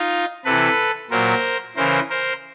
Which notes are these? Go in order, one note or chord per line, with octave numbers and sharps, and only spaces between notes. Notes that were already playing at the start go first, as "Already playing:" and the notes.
Already playing: D#4 F4
C3 E3 A4 B4
A#2 F#3 A#4 C5
C#3 E3 A#4 C5
A#4 C5